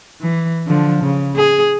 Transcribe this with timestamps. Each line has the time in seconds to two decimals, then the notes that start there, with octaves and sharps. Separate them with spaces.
0.22 E3
0.67 D3 F3
1.03 C#3
1.36 G#4